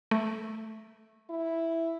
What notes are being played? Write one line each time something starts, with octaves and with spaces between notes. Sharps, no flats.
A3
E4